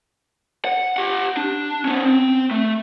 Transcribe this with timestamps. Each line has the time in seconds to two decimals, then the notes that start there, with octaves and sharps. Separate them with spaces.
0.65 F#5
0.97 G4 F#5
1.37 D4
1.85 B3 C#4
2.05 C4
2.51 A3